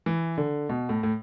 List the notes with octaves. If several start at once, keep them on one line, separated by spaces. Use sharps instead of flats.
E3
D3
B2
A2
A2